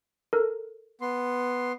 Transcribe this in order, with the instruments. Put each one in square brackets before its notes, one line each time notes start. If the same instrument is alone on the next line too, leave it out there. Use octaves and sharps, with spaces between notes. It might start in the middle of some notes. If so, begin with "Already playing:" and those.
[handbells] A4 A#4
[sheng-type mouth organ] B3 C6